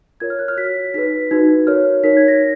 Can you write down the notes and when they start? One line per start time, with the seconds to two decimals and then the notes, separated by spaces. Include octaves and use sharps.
0.20 F4 A#4 C#5 G#6
0.30 F6
0.39 F#6
0.48 F6
0.57 F#4 C#5 B6
0.94 D#4 G#4 B4 B6
1.31 D#4 F#4 B4 G#6
1.67 F#4 A#4 C#5 F6
2.04 D#4 A#4 C#5 B6
2.17 G#6
2.28 A#6